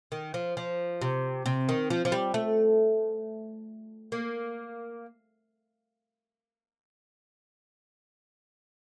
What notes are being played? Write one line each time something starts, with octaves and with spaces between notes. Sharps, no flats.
D#3
F3
F3
C3
C3
D#3
F3
F3
G3
A3
A#3